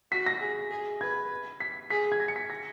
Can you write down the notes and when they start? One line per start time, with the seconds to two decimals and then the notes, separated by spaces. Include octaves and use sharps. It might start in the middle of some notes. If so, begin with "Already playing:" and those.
0.11 F#4 B6
0.26 A#6
0.41 G#4
0.71 G#4
1.01 B4 G#6
1.60 B6
1.90 G#4 B6
2.12 G#6
2.20 A#6
2.28 C#7
2.36 B6
2.50 A#6